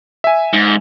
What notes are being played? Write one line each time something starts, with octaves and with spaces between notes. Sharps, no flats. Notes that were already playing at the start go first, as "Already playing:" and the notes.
E5 G#5
G#2